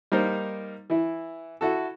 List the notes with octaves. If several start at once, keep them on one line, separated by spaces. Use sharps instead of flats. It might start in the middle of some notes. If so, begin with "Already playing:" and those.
G3 A#3 D#4 A#4 C5
E3 E4
E4 F#4 A4